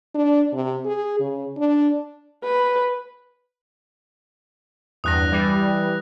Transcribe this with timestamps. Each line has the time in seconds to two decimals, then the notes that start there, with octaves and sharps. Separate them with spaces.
0.15 D4
0.53 C3
0.85 G#4
1.20 C#3
1.57 D4
2.44 B4
5.04 E2 G2 D#6 F#6 A#6
5.31 E3 G3